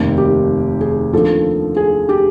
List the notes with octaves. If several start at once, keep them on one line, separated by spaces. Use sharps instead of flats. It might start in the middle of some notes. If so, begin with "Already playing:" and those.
Already playing: F1 D#2 D#3 G4
G4
G#4
D#2 D3 F3 A4
G#4
G4